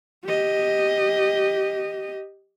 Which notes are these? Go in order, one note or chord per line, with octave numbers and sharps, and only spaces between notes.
G4 D#5